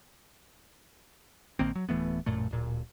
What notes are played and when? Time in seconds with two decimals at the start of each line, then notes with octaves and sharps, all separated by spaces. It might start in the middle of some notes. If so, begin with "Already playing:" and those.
1.59 A#1 D#3 A#3 C4
1.75 F#3
1.89 D1 E3 A3 B3
2.26 A1 F#2 A#2 A3
2.51 D1 A#2